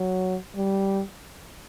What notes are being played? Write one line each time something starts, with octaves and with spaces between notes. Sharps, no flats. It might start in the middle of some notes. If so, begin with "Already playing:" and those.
Already playing: F#3
G3